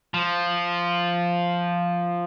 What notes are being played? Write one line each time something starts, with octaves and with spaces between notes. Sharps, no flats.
F3